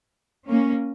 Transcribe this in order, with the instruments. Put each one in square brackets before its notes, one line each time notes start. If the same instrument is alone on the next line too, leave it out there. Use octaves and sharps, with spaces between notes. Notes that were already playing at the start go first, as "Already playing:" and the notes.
[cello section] A#3 C#4